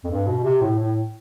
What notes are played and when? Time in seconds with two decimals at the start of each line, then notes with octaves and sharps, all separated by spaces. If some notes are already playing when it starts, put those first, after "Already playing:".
0.04 F2
0.11 G2
0.27 B2
0.44 C3
0.61 A2
0.79 A2